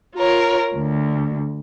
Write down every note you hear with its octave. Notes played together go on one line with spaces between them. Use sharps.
F4 A#4 C#5
D2